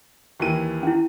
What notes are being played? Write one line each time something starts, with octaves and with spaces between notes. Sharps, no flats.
D#2 E3 D#7
C#4 E4